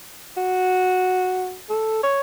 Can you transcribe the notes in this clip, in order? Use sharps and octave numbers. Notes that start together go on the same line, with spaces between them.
F#4
A4
C#5